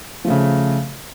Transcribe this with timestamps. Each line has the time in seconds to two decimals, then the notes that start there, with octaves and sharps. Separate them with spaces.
0.25 F3
0.27 A3
0.30 C#3